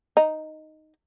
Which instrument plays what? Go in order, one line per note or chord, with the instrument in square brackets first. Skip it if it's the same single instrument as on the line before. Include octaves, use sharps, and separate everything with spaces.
[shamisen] D#4